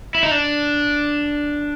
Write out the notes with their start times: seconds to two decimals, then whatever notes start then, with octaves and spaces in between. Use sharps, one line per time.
0.15 E4
0.23 D#4
0.31 D4